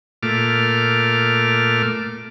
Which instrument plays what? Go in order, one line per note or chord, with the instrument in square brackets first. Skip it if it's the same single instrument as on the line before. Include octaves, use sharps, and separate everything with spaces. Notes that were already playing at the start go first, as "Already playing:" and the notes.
[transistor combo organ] A#2 A3 D6 F6